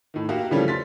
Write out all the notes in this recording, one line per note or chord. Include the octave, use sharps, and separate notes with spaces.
A2 D#3
A#3 F#4 G4 E5 F5
C#3 E3 F3 G3 A3 C#4
C6 A6 B6